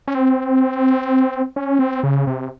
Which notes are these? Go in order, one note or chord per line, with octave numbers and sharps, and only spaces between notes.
C#4
C4
C#4
C4
C#3
C3